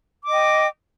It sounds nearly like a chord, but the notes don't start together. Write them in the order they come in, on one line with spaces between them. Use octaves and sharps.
D6 D#5 G5